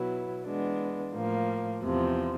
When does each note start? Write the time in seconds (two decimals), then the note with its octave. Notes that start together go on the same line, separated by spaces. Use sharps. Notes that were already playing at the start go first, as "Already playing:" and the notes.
Already playing: B2 F#3 B3 E4
0.46 E3 G#3 B3 D4
1.15 A2 F3 A#3
1.83 E2 C3 F3